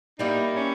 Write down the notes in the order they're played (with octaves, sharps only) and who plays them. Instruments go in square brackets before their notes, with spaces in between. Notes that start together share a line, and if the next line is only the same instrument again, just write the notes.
[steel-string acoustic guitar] G3 A#3 E4 [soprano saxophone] D#4
[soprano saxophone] C#4